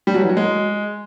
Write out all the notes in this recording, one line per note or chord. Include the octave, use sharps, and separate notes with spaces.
G3
F#3
E3
F#3
G#3